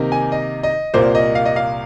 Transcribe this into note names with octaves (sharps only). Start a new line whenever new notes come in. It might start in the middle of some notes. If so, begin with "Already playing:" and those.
Already playing: C3 D#3 A#3 D#4
G#5
D#5
D#5
C2 A#2 A#3 C5
D#5
F5
D#5
F5